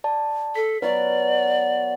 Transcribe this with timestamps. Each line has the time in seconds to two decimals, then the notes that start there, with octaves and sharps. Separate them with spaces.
0.04 D5 A5
0.56 A4 B6
0.82 F#3 B3 F#4 B4 D5